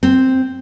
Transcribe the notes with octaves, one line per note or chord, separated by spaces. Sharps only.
C4